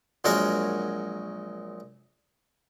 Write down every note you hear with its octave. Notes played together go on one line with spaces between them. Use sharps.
A#1 F#3 G#3 F#4 A#4 C#5